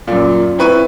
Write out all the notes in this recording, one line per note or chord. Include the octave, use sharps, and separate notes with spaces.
F#2 A#2
C4 E4 B4 C#6 D#7